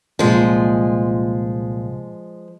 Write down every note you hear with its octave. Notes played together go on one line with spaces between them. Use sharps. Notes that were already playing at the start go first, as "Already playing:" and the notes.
C2 A#2 F3 G#3